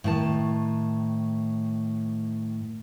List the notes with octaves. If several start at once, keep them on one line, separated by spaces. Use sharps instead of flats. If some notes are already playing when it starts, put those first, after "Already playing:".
A2 D#3 A5